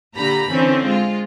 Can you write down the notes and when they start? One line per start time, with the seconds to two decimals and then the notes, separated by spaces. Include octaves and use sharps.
0.17 A#2 D3 G4 A#5 B5
0.51 D3 E3 C4 C#4
0.87 G#3 F4